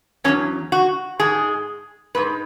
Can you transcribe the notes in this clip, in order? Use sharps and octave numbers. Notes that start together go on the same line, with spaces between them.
E2 B2 F#3 C#4
F#4
G#2 G#3 G#4
G#2 G#3 B4